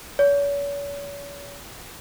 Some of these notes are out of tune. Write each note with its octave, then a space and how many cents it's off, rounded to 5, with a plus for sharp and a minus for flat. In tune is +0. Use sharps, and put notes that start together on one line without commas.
C#5 +40